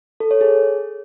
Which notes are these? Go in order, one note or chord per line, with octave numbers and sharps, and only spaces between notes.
A4
C#5
G#4